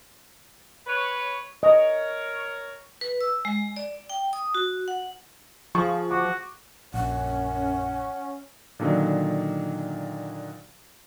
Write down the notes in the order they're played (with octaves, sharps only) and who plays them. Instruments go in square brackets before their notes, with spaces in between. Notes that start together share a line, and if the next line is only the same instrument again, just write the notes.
[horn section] B4 C#5
[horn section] A#4 C#5 [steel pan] D#5
[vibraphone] B4
E6
G#3
D5
G5
D#6
F#4
F#5
[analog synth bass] F3 [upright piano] G#4 C#6
[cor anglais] F#4 [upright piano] D6
[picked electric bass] A#1 [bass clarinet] F#2 [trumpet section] C#4 [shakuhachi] F#5
[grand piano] A#2 D3 D#3 F#3